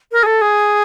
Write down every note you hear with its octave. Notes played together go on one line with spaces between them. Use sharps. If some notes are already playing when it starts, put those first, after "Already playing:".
A#4
G#4
A4
G#4